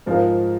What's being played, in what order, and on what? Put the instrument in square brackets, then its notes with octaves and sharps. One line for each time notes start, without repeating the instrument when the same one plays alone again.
[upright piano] G#2 F3 G#3 F4 A#4